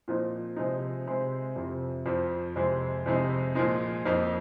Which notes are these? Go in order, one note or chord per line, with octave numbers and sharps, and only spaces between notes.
A#2 F3 C4 D#4
C3 F3 G#3 D#4
C3 G#3 C4
F2 C3 F3
F2 F3 C4
F2 C3 G#3 C4
F2 C3 G#3 D#4
A#2 F3 G#3 D#4
F2 F3 A#3 D#4